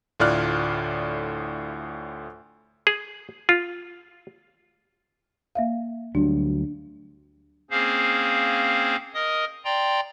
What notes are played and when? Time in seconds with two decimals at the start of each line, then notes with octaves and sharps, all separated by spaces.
0.20 D2 A2 F4 D5 F6 F#6
2.87 G#4
3.49 F4
5.55 A#3 E5 F5
6.15 D2 F#3 G3 D4
7.71 A#3 C4 C#4 G#4 C5 F5
9.14 A#4 D#5 D#6
9.65 D5 G5 A#5 C6